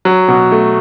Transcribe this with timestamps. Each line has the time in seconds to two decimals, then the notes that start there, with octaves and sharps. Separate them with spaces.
0.05 F#3
0.28 B2
0.52 A3